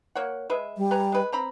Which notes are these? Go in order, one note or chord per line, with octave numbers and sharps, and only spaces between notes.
A#3 C#5 F#5
G#3 B4 E5
G3
B4 G#5 A#5
G#3 B4
C4 A#5 B5